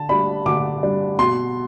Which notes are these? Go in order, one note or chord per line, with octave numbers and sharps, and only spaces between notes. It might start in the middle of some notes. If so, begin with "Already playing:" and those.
Already playing: D3 A5
G3 D4 B5
D3 D6
G3 D4
B2 C6